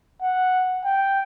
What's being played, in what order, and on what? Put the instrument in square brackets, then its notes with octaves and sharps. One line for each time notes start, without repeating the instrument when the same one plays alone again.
[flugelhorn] F#5
G5